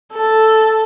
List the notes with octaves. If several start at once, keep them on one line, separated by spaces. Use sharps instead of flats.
A4